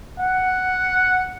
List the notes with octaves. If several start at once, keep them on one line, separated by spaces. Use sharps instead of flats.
F#5